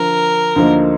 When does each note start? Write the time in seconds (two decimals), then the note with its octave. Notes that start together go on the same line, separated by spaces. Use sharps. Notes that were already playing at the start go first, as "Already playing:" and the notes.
Already playing: D3 F3 A#4
0.56 D2 D3 F3 A#3 D#4